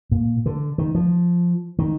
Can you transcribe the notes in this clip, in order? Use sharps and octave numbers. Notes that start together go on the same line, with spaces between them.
A#2
D3
D#3
F3
D#3